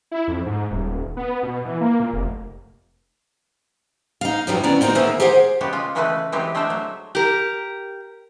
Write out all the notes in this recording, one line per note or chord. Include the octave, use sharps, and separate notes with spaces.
E4
F2
G#2
D#1
B3
B2
E3
A#3
A#2
F1
D#4 F5
F#2 A2 D#3 E3 F#3 G3
D2 B3 C#4 E4 D5 A#5
A#3 C4 D#4 F#4 A#4
D#3 F#3 A#3 B3 G#4 E5
G4 G#4 A#4 C5 E5 F#5
C#3 G#3 B3 F#4 G4
G#3 F4
C#3 E3 G#3 A3 F#4 B4
E3 F#3 G#3 C4 G4 B4
G#3 A3 D4 C5 E5 G5
F#3
G4 A#4